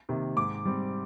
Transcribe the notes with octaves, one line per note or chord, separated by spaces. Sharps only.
C3 D#3 A#3
G#2 D6
G3 C4